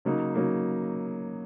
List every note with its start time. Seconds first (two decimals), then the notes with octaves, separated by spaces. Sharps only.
0.05 C#3 F#3 A#3 D#4
0.34 C#3 F#3 A#3 D#4